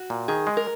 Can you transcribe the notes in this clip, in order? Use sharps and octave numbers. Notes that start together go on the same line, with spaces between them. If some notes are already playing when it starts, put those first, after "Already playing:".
Already playing: F#4
A#2
D#3 G#4
G#3
A#4